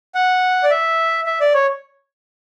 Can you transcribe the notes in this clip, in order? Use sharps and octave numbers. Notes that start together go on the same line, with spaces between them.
F#5
D5
E5
E5
D5
C#5